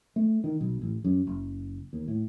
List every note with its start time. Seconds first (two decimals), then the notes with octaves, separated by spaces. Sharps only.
0.16 A3
0.44 D#3
0.61 B1
0.82 A1
1.04 F#2
1.27 F#1
1.93 D#2
2.08 A2